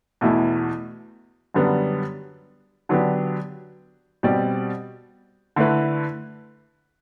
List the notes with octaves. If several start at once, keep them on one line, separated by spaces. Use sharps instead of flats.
E2 B2 A3 E4
F#2 D3 G3 B3 D4
D3 F#3 B3 D4 G4
B2 G3 C4 G4 D5
D3 A3 E4 B4